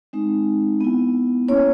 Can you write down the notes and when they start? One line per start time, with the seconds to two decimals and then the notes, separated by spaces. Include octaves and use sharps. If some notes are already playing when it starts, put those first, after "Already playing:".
0.13 G#3 C4 D#4
0.81 B3 E4
1.48 A#3 C#4 E4 C#5